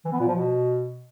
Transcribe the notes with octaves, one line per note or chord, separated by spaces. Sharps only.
E3
B3
A#2
F3
B2